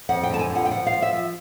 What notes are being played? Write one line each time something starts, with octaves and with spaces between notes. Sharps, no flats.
F2 F#5
G5
D3 A5
G#5
F2
F#5
G5
F3 F#5
F3 F5
E5
F3